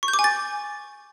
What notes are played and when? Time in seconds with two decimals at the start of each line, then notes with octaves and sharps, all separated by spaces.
0.03 C#6
0.08 G6
0.13 D6
0.19 G#5
0.24 A6